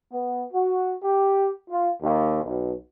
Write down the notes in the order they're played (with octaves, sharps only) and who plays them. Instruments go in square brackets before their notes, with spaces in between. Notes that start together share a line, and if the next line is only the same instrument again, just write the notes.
[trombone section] B3
F#4
G4
F4
D#2
B1